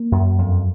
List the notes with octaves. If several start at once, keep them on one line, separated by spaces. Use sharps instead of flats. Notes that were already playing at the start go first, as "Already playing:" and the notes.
Already playing: A#3
F#2
F2